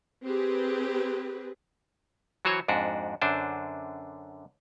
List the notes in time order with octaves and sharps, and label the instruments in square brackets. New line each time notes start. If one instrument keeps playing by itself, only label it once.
[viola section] C4 G4 G#4 B4
[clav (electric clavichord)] E3 F#3 F#4 C5 C#5
F2 G#2 D4 F#4
F#2 D3 D4 C5